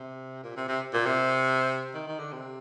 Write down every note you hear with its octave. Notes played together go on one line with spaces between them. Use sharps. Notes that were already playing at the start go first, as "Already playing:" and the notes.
Already playing: C3
A#2
C3
C3
A#2
C3
D#3
D#3
D3
C3